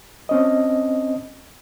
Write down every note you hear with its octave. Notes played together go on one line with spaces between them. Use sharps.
C4 C#4 D#5